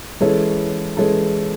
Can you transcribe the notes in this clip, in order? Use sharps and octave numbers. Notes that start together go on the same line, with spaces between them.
E3 G#3 C#4 E4 A4
E3 G#3 C#4 E4 A4